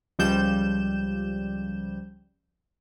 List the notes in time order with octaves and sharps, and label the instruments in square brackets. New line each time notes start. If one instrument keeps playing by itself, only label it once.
[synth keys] C#2 F3 G3 G6 E7